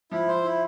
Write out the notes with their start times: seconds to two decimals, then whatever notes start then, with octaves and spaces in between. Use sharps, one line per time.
0.11 F3 E4
0.28 C5
0.44 E4